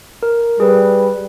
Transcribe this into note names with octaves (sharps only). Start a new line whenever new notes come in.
A#4
G3 G#4 B4